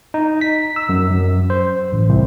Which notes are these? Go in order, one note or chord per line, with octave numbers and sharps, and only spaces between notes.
D#4
B6
E6
F#2
F#2
C5
A1
C2